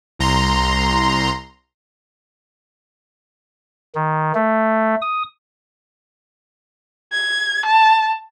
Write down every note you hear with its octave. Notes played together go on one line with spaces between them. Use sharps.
C2 A#5 C6
D#3
A3
D#6
G#6
A5